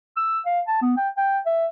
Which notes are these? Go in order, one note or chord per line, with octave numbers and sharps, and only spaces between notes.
E6
F5
A5
B3
G5
G5
E5